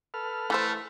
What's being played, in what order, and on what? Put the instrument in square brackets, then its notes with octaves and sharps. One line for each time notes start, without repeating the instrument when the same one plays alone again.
[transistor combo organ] A4 B4 F6
[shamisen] E3 C5 [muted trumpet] A3